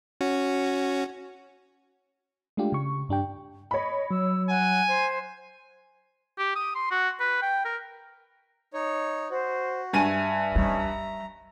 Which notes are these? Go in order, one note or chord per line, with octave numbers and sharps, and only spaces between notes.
C#4 F#4
G#3 A3 D4 F4 G4
C#3 C#6
G2 D4 G4 G5
C#5 D#5 B5
F#3 E6
F#5 G#5
C5
G4
D#6
C6
F#4
B4
G5
A#4
D#4 C#5
F#4 C5
G2 E5 G#5 D#7
G3 C#4 D#4
A#5